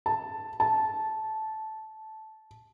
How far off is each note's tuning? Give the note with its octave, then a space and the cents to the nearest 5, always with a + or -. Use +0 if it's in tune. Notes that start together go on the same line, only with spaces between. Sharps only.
A5 +5
A5 -10